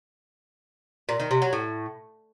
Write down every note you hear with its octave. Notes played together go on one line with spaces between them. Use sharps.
A#2
D#3
C3
F#3
A2